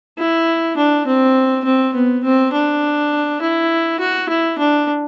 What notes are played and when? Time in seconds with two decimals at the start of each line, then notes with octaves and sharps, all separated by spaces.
0.18 E4
0.77 D4
1.06 C4
1.64 C4
1.94 B3
2.24 C4
2.52 D4
3.41 E4
4.00 F#4
4.29 E4
4.58 D4